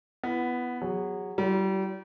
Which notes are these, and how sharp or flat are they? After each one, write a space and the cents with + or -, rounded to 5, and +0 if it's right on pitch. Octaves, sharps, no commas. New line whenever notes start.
B3 +0 E4 +20
F#3 +0 G#4 -25
G3 -35 E4 +40